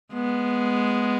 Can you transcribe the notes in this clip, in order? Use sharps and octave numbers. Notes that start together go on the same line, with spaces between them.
G#3 B3